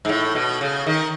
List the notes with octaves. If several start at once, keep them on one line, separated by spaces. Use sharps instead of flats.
G#2
A2
B2
C#3
D#3